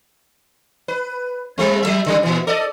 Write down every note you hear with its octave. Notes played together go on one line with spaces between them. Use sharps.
B4
G3 A3 C4
F#3 A3 E5
C#3 G3
A#2 E3
A4 D5 D#5